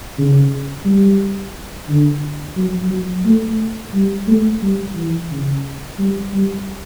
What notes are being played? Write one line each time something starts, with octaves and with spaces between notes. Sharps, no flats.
C#3
G3
D3
F#3
F#3
A3
G3
A3
G3
E3
C#3
G3
G3